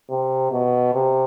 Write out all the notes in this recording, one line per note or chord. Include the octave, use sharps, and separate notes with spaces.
C3
B2
C3